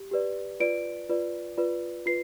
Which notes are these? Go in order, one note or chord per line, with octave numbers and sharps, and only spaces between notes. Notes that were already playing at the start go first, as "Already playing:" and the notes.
Already playing: G4
G4 B4 D5
F4 B4 D5 D7
F4 B4 D5
F4 B4 D5
F4 B4 C7